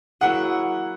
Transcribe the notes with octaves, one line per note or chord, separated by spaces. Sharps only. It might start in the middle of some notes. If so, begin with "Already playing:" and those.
F#3 A#3 E4 G#4 F#5